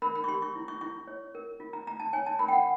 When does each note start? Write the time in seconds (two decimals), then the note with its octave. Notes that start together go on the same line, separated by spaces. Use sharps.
0.02 A#4 B5
0.15 B5
0.24 C#6
0.28 G4 C6
0.42 C#6
0.55 E4
0.68 C#6
0.81 E4 C#6
1.07 C#5
1.35 A#4
1.60 F4
1.73 A#5
1.87 F4 A#5
2.00 A5
2.13 C#5 G#5
2.26 A5
2.39 A#4 B5
2.48 G5
2.52 F#5